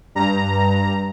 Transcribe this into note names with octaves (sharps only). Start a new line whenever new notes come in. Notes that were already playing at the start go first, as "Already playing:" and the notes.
G2 A#5